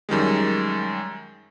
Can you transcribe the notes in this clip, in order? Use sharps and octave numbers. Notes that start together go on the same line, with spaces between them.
F#2 D#3 G3 G#3